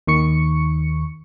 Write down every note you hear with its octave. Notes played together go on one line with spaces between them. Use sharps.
D#2 D#3 C#6 C#7